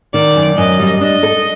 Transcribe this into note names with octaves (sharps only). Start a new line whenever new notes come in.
D#3 D5
F#2
F#2 D#5
G3
D4 D#5
A4